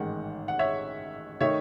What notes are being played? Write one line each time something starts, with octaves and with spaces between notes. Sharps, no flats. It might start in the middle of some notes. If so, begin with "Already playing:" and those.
Already playing: A1 G#2 D#3 G#3 F#5
F#5
C#5 E5
D#3 A3 D#4 C#5 E5